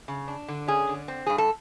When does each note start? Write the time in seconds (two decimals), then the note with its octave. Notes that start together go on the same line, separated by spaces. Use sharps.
0.08 C#3
0.28 D4
0.49 D3
0.68 C#4 G#4
0.89 D3
1.08 C4
1.26 G2 G#4
1.38 A4